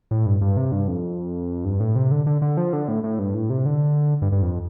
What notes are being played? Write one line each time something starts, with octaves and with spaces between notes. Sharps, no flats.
A2
G2
G2
C3
G2
F2
G2
A2
C3
D3
D3
D3
F3
D3
A2
A2
G2
A2
C3
D3
G2
G2
F2